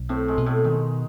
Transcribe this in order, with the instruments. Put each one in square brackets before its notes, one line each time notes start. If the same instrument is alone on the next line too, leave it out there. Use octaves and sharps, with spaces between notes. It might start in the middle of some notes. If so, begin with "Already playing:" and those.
Already playing: [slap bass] B1
[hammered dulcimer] A2 A3 [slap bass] C4
[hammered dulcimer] G#3
[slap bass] B2
[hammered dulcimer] A2 A3
[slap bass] D#3 [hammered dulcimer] G#3